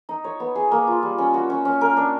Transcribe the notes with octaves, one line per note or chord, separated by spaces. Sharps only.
D#4
C#5
B3
G#4
A#3
F4
G3
C#4
F#4
C#4
C#4
A#4
D4